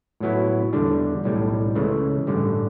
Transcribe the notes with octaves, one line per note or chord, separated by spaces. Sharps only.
A2 F#3 B3 E4
E2 D3 G3 D4
B1 A2 G3
C#2 C#3 E3 A3
A1 G2 D3 G3